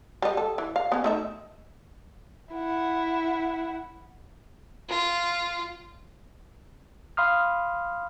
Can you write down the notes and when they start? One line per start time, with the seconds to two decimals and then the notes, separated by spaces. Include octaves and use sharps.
0.22 G3 D#5
0.37 A4
0.58 E3
0.76 F5
0.92 B3 C#4
1.04 A3 D#4 E5
2.53 E4 F#5
4.89 F4
7.17 F5 B5 C6 D#6 F6